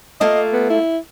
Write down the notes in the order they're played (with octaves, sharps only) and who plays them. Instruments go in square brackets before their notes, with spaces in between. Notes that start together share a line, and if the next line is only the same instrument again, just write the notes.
[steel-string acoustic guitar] A3 A#3 F4 [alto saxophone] D#5
[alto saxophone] B3
E4